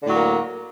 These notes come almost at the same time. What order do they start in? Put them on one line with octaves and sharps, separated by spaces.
D3 A2 F#3 A#3